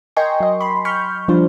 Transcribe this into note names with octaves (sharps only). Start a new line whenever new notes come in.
A#4 D#5 G5 G#5 C6 C#6
F#3 D#5
B5 C6
B5 C#6 F6 G6
F3 G3 D4 F4 C5